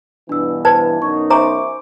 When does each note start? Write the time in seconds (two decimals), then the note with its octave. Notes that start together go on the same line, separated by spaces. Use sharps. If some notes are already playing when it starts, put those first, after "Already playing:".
0.29 G2 B2 E3 D4 E6
0.65 B4 C5 A5 G#6
1.02 F#2 B2 D#4 C#6
1.30 C5 E5 G#5 A#5 C#6 D6